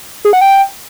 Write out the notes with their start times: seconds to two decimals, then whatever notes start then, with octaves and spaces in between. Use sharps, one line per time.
0.25 G#4
0.33 F#5
0.41 G5